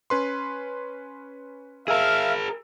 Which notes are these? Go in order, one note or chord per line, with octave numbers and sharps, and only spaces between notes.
C#4 B4 C6
G#4 A#4 E5 F5 E6